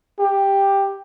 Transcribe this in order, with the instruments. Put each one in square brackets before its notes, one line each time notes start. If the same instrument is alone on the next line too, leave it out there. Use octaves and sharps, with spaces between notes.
[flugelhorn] G4